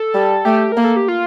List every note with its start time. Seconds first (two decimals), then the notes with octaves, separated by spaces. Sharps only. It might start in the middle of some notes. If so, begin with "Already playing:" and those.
Already playing: A4
0.14 G3
0.45 A3 G4
0.72 A#3 A#4
0.84 A4
0.96 G4
1.08 F4